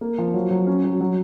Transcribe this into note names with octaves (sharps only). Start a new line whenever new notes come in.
A#3
F3
F#3
F#3
C#4
F#3
F#3